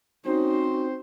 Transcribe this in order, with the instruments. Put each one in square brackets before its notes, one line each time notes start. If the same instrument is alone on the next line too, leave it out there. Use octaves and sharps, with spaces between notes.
[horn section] C4 C5 [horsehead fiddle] C#4 D#4 [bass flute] F#4